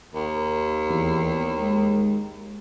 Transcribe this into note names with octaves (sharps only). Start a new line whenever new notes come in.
D#2
E2
G#3